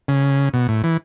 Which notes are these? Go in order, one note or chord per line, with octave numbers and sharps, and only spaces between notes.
C#3
B2
A2
E3